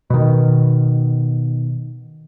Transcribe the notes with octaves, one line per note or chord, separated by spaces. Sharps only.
B2 D#3